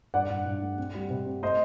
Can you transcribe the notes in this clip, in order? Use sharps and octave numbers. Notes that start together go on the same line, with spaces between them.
G2 D5 F#5
G2
G2
A3
C4
G3
C3
C4
A3 C5 D#5